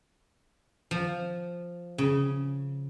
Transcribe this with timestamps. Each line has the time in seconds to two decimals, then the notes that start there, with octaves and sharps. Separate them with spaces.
0.91 F3
1.98 C#3